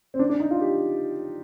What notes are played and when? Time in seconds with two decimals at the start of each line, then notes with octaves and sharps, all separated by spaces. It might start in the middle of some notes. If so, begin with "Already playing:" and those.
0.14 C4
0.19 D4
0.30 D4
0.40 D#4
0.51 F4
0.61 G4